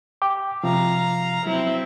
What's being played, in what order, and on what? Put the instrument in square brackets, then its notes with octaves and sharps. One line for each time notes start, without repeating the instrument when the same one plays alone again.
[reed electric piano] G5 D6
[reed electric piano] C3 F3 [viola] F5 A#5
[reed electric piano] F#3 [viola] C4 E4